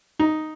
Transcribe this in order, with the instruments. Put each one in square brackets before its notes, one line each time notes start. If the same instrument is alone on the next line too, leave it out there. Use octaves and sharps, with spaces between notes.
[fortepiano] D#4